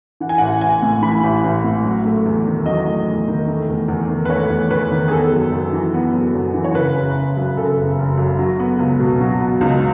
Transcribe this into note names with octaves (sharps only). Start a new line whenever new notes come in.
E3 F#5
G#5
A1 F#5
A1 G#5
A2
E3 B5
A1
A1
A2
F#3
A3
E2
D#3
F#3 D#5
A3
E2
D#3
A3
E2
E2
D#3
B4
A3 C#5
E2
E2 B4
D#3
G#4
B3 A4
F#2
F#2
E3
B3
F#2
F#2
E3
C#5
C#3 B4
F#1
F#1
F#2
C#3 A4
F#1
F#1
F#2
F#3
B3
C#2
B2
F#3
B3
C#2 D#4